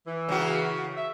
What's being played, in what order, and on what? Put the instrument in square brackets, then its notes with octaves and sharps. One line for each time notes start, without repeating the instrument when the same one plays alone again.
[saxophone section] E3
[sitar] C#3 A#3 F#4
[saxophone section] E5